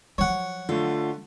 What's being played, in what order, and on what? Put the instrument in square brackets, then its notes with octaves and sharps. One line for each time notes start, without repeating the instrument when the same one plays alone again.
[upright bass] F3 F#3 [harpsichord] C#5 F#5
[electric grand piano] D3 A3 [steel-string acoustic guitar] F4